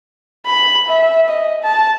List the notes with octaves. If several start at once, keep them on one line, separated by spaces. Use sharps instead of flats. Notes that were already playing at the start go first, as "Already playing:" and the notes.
B5
E5
D#5
A5